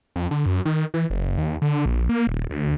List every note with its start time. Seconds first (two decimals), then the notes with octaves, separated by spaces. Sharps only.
0.16 F2
0.31 D3
0.46 F#2
0.65 D#3
0.94 E3
1.10 F#1
1.38 D#2
1.62 D3
1.86 A#1
2.09 A#3
2.27 D#1
2.50 D2